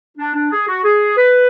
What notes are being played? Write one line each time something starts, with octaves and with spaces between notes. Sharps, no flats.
D4
D4
G#4
F#4
G#4
B4